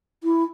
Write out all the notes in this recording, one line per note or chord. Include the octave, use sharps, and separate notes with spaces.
E4